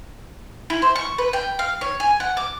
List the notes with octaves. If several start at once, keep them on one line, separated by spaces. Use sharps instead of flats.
E4
C5
C#6
B4
G5
F5
C#5
G#5
F#5
D6